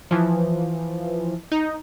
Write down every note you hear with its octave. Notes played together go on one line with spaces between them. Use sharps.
E3 F3
D#4